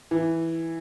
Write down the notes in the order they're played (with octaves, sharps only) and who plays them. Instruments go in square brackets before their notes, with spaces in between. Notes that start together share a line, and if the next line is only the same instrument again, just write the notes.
[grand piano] E3